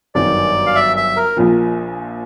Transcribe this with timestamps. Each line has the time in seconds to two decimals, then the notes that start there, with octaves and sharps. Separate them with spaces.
0.15 G1 F#2 D#3 D5
0.66 F5
0.75 E5
0.97 E5
1.16 A#4
1.37 A#1 A#2 F3